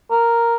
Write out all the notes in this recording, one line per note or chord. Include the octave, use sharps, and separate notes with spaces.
A#4